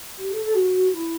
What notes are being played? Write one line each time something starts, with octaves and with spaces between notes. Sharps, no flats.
G4
A4
A4
F#4
E4